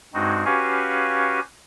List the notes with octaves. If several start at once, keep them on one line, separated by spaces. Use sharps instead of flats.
G2 G#3 C4 D#4 F#4
C#4 F#4 G4 B4 F5 G#5